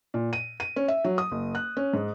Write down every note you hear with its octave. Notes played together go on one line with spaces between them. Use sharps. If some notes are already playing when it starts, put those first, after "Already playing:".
A#2
D#7
D#7
C#4
E5
F#3
D#6
F#1
F#6
C#4
G#2